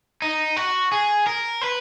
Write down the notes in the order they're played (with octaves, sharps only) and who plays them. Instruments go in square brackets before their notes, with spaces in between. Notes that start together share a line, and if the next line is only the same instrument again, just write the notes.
[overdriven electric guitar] D#4
F#4
G#4
A#4
B4